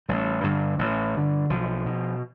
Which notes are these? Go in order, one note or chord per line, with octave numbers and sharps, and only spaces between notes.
A1 G3
G2 D3
A1
G2 D3
B1 F3
B2